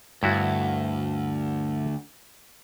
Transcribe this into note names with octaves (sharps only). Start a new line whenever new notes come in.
D2 G2 E4 F#4